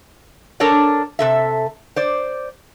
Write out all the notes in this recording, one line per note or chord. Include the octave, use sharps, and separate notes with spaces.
D4 A4 A#4 C#5 D5
C3 A4 E5
C5 D5